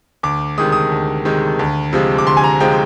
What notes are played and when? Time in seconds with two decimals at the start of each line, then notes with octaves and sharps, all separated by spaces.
0.23 D2 D6
0.58 C3 D#3 G#3 D#6
0.72 D#6
0.92 D2
1.25 C3 D#3 G#3
1.59 D2
1.93 C3 F3 G#3
2.18 D6
2.27 D2 C6
2.37 G#5
2.44 A#5
2.60 C3 F3 G#3 G5